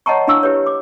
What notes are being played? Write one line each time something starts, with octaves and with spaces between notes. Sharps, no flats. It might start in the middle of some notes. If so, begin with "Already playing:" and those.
C#5 D#5 F#5 A5 A#5 C#6
D4 E4 F5 C#6 E6
E4 G4 B4 C#5
D6